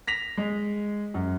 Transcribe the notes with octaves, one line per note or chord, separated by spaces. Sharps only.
A#6 B6 F7
G#3
F#2